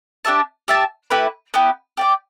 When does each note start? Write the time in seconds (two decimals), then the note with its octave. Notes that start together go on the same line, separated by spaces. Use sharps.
0.25 D4 G4 E5 A5
0.68 G4 E5 A5
1.10 A3 E4 G4 B4
1.54 B3 E4 G4
1.97 G4 D5 G5